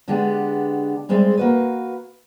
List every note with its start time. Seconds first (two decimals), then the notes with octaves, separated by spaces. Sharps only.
0.08 D3 G#3 B3 D4 G4
1.09 G3 G#3 C4 G#4 D5 E5
1.37 A#3 F#4 B4